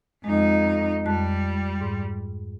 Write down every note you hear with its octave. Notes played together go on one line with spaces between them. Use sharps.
F2 G#3 D#4
F2 G3 A5 F#6
G#2